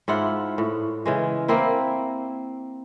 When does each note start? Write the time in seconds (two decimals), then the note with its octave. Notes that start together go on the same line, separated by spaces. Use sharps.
0.08 G#2 E4 F4 F#5
0.58 A2
1.06 C#3 E3 G#3
1.48 A#3 C4 E4